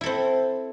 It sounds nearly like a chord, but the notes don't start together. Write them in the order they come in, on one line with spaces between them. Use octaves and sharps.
E4 A4 C4